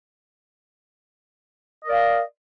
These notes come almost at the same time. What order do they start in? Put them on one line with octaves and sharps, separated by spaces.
D#5 A#4 D5 F5